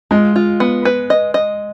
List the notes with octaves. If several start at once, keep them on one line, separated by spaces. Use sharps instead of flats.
G#3 F4
F4
B3
B4
D#5
D#5